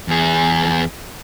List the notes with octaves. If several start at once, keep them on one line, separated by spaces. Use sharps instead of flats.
E2 G#4